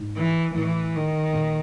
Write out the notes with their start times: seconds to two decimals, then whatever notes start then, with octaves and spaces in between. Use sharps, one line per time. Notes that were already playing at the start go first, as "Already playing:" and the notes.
Already playing: G#2
0.17 E3
0.55 A2 E3
0.95 D#3
1.34 A#2